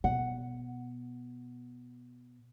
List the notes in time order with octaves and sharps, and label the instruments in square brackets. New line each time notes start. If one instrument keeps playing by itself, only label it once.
[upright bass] B2 [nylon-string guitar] F#5